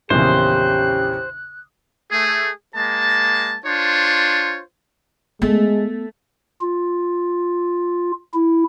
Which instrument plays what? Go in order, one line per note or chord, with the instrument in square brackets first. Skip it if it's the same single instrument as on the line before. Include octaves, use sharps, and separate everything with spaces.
[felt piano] A#1 E2 C#3 [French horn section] C#4 G4 [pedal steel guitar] C5 [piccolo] F#6
[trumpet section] A3 G#4
G#3 A#3 A5
D4 F4 C5 C#5
[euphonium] G#3 [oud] A3 [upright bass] B3
[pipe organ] F4
E4